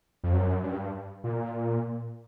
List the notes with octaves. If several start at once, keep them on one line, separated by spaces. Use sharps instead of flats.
F2
F#2
G2
A#2